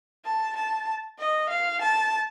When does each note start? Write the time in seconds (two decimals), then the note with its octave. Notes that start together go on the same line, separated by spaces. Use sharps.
0.25 A5
0.56 A5
1.18 D#5
1.49 F5
1.81 A5